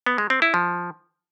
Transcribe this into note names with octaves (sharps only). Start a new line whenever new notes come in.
B3
G#3
C4
E4
F3